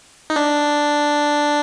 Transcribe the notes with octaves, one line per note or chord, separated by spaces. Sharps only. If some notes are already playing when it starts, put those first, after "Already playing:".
D#4
D4